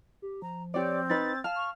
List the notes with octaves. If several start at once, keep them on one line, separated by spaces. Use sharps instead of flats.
G4
F3 A#5
C4 G4 C#5 D5
D#4 B4 A6
F5 A5 F6
C#6